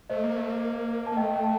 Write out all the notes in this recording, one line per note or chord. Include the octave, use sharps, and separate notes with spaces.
A3 C5 D#5
A#3
A3
A#3
A5
A#3
A3 D#5 G5
G5
A5